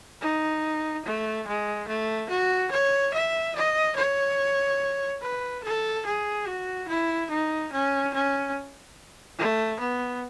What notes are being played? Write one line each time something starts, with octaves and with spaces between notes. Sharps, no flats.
D#4
A3
G#3
A3
F#4
C#5
E5
D#5
C#5
B4
A4
G#4
F#4
E4
D#4
C#4
C#4
A3
B3